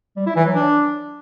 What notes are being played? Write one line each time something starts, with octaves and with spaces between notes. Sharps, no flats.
G3
E4
E3
F#3
D4